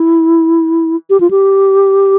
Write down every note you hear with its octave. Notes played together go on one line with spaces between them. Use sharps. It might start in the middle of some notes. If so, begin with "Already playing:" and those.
Already playing: E4
G4
F4
G4